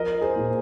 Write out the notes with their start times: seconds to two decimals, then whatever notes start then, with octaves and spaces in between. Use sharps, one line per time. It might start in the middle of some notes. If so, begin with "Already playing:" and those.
Already playing: F3 A#4 D#5
0.21 G#4 C5
0.36 A#2